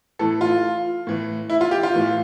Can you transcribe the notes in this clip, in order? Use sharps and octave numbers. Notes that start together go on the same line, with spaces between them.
A2 E3 A4
F4
A2 E3
E4
F4
G4
F4
A2 E3